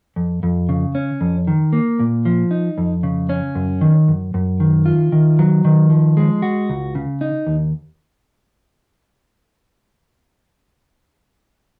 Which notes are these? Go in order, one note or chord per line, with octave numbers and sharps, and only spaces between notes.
F2
F2
C#3
C#4
F2
D#3
A#3
A#2
F3
D#4
F2
C#3
C#4
F#2
D#3
F#2
F#2
D#3
F4
D#3
F#3
D#3
F3
G#3
F#4
C#2
C#3
D#4
D#2